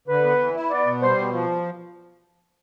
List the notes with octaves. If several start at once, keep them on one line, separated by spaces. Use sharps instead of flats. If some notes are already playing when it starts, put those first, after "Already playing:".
D3 B4
B3
E3
E4
B3 D5
B2
G3 C5
B2
F3